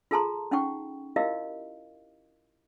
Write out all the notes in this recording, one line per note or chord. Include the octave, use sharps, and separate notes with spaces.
F4 G#4 A4 A5 A#5 C6
C#4 D#4 F#5 G5 C#6
E4 F4 G4 A#4 D#5 F5